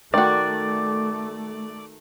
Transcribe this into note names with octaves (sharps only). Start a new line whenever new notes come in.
D#3 A3 F#4 D5